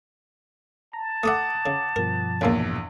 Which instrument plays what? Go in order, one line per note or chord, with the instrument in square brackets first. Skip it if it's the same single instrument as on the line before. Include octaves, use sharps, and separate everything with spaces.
[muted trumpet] A5 [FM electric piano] A#5
[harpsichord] A3 A4 E5 [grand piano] F#5 D6 D#6
[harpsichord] C#3
[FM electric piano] G2 B2 F3 [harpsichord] A#4
[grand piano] A#1 E2 [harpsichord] C#3 A#3